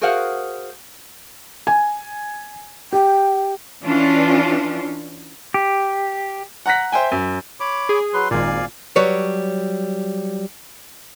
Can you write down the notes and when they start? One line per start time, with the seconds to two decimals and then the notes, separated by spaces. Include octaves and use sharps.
0.01 F#4 G#4 A#4 C5 F5 F#5
1.67 G#5
2.93 G4 G5
3.84 E3 C#4 D4 F4
5.54 G4
6.66 F#5 A#5 F#6 A#6 B6
6.92 C5 E5 G5 G#5
7.12 F#2
7.60 C#5 B5 D6
7.89 G#4
8.14 F#3 B4 C6
8.31 G#1 A#2 D5 F5 G#5
8.96 F#3 G3 B4 C#5